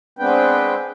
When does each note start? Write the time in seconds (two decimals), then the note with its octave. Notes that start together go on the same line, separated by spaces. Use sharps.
0.19 G#3 B3 C4 D4 B4 G5